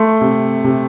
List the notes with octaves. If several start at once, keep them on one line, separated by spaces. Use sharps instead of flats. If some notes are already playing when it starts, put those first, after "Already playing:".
Already playing: A3 C6
C3
C3